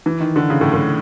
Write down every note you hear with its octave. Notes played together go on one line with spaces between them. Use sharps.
E3
D#3
D3
C#3
A2
A2